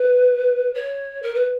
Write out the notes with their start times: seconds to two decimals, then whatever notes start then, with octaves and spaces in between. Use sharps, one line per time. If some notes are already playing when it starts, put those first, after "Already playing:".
Already playing: B4
0.74 C#5
1.22 A#4
1.34 B4